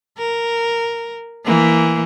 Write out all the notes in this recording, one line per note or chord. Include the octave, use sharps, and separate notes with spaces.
A#4
E3 A#3